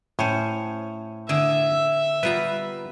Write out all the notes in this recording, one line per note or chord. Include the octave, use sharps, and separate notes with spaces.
A2 C#4 C5 C#5 G#5
D3 G#4 D5 E5
G3 B3 F4 B4 A#5